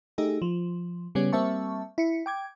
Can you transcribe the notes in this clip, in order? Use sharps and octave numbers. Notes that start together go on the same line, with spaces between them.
A3 D#4 G4 G#4
F3
C#3 G3 B3 C#4
G3 A#3 C4 E5 A5 C#6
E4 C#7
G5 D6 G#6